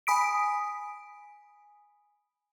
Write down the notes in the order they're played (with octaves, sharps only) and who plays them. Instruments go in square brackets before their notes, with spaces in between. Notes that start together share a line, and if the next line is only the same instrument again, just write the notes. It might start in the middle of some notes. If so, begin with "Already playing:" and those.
[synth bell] G#5 B5 D#6 B6 D7